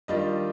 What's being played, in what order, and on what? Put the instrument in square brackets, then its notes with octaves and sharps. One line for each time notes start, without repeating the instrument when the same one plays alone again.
[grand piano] D#3 G3 D4 F4 D#5